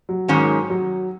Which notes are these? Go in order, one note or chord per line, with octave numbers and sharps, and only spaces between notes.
F#3
G#2 D#3 G#3 C#4
F#3